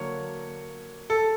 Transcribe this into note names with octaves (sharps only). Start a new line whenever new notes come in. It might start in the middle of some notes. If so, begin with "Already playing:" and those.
Already playing: D3 F#3 A#3 C#5
A4